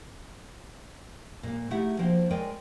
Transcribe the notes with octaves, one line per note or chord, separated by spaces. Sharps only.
A#2 A#3
A3 D#4 E4 G4 G#4 F#5
F3 A#3 D4 F#4 C5 G5
G#3 A#4 C#5 D5 G5 G#5